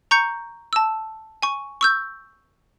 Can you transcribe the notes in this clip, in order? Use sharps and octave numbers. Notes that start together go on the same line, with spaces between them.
A#5 C#6 G6 C#7
A5 E6
G#5 C#6
C#6 E6 G6